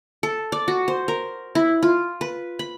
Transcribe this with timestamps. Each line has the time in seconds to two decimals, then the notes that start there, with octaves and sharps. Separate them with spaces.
0.23 A4
0.52 D5
0.68 F#4
0.88 C5
1.08 A#4
1.55 E4
1.83 F4
2.21 B4
2.59 B5